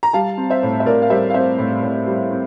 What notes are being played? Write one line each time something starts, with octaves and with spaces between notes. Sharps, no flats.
A#5
G3 F5 A5
C4
C5 E5
A2
E5
A2 A#4 D5
F5
G3 C5 E5
F5
C4 C5 E5
A2
A2
G3
C4